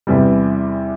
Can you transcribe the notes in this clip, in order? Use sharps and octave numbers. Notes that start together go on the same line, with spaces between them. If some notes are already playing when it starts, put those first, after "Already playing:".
E2 C3 E3 G3